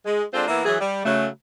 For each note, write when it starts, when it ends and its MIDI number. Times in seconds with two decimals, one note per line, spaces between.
0.06 0.24 56
0.34 0.45 56
0.34 0.45 60
0.34 0.45 62
0.34 0.45 65
0.34 0.45 69
0.34 0.45 72
0.48 0.65 52
0.48 0.65 58
0.48 0.65 59
0.48 0.65 64
0.65 0.77 52
0.65 0.77 54
0.65 0.77 68
0.80 1.03 55
1.05 1.27 49
1.05 1.27 54
1.05 1.27 57